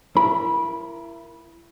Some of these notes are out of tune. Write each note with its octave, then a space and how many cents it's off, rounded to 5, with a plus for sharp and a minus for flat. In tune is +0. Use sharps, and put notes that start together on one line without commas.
E4 +30 A#4 +0 B5 -20